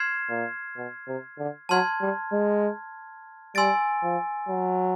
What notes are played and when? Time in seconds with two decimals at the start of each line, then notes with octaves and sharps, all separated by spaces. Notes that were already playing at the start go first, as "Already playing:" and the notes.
Already playing: C6 F6 G#6 C7 E7
0.30 A#2
0.77 B2
1.07 C3
1.39 D3
1.69 F#3 A5 C6 F6 G#6
2.01 G3
2.32 G#3
3.55 G3 G#5 C6 E6 A6 D7
4.03 F3
4.48 F#3